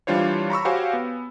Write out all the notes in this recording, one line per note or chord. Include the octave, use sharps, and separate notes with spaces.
E3 G3 D4 F4 C5 C#5
A#5 B5 C#6 E6
F#4 G4 C5 C#5 F5 G#5
B3